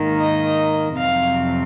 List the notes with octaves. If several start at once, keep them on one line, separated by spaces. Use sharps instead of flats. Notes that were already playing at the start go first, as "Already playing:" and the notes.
Already playing: G#2 D#3 A#3
D#5
F2 C3 F#3 C4 F5